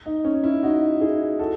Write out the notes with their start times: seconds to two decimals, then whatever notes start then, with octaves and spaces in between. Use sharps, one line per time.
0.06 D#4
0.25 C#4
0.44 C#4 E4
0.63 D#4 F#4
1.01 E4 G#4
1.39 F#4 A4